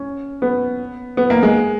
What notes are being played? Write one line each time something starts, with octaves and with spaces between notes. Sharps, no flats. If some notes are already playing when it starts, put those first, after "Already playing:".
Already playing: C#4
B3
B3
A#3
G#3